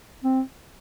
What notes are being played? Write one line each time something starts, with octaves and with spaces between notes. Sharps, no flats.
C4